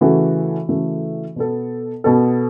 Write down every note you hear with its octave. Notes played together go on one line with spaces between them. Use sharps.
C#3 E3 A3 F#4 A4
C#3 E3 A3 F#4 A4
B2 B3 A4
B2 B3 A4